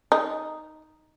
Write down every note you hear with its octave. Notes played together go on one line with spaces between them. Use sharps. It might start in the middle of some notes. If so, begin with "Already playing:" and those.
D#4